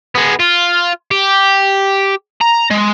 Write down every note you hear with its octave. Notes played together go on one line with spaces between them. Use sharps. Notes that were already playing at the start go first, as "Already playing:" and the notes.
G#3 B3
F4
G4
A#5
G#3